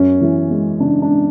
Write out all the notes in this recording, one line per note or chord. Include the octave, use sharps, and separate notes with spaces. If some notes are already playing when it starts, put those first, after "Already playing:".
Already playing: F#2 C#4
E3
G#3
C#3 D4
D4